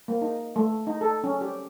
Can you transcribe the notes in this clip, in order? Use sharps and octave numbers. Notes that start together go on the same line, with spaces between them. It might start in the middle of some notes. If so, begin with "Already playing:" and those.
A#3
D#4
A3
D#4
A4
C#4
G4